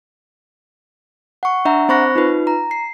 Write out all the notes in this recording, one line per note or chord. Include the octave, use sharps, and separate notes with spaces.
F#5 C#6
D4 E5 F#5 A#5
C4 C5 B5 C#6 F#6 A#6
D#4 F4 B4
A#5
C7